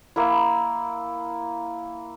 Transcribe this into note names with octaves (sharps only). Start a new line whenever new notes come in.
A#3 E4